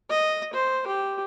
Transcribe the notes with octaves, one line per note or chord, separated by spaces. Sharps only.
D#5
C5
G4